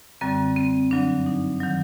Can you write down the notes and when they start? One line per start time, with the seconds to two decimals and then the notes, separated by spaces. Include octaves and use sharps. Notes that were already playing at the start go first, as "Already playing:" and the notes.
0.21 F#2 D3 G3 C4
0.56 C4
0.91 G2 D3 F#3 D4
1.26 D#4
1.60 D#3 F#3